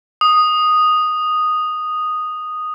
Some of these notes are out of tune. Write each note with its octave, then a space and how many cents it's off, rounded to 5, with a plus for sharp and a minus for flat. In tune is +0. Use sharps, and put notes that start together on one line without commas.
D#6 -5